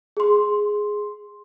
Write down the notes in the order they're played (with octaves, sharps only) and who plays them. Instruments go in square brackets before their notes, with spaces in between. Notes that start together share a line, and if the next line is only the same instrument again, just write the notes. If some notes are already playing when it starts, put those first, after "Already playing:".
[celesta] G#4 C6